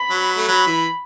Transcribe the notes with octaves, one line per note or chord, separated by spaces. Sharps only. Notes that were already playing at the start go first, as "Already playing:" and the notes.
Already playing: B5
F#3
A3
F#3 B5
E3